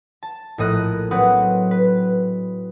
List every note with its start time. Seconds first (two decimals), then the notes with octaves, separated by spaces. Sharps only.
0.23 A5
0.58 A#1 A2 D#5 F#6
1.11 F#3 C4 B4 F#5 D#6
1.71 B4